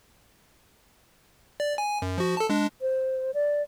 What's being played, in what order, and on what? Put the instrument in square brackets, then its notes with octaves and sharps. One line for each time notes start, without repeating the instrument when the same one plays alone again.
[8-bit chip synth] D5
G#5
F#2
F3 F#4
A4 A5
G#3 D4
[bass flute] C5
D5